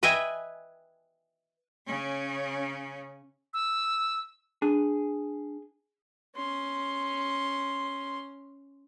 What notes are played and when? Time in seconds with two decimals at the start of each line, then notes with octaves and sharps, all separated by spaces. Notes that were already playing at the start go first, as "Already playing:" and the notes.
0.03 B4 D#5 E5 G5 G#5
1.86 C#3 C#4
3.54 E6
4.62 D4 G#4
6.36 C#4 C6